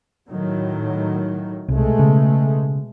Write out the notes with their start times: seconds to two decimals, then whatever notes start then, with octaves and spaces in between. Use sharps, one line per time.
0.28 A2 D#3 F#3
1.68 C2 B2 G#3 A3
1.99 C#3